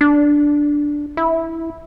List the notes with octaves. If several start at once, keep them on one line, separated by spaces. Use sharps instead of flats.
D4
E4